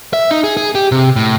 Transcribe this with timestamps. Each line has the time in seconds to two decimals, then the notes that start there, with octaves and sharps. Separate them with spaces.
0.13 E5
0.31 D#4
0.44 G#4
0.57 G#4
0.75 G4
0.92 C3
1.16 A2